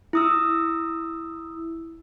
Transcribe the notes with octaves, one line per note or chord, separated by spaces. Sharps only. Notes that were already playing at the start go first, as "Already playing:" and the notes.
E4 D#6 E6